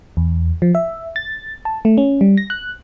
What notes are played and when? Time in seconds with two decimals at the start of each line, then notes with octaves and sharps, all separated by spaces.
0.17 E2
0.62 F3
0.75 E5
1.16 A6
1.65 A5
1.85 A3
1.98 C#4
2.21 G3
2.37 A#6
2.50 F#6